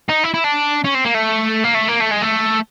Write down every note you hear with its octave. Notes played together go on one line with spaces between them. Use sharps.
D#4
E4
E4
D4
C#4
C4
A#3
A3
A#3
A3
A#3
A3
G#3
A3